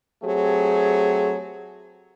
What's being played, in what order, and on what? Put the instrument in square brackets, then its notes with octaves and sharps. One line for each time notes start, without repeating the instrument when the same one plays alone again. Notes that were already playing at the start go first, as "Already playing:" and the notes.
[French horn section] F#3 A3 C4 G4 G#4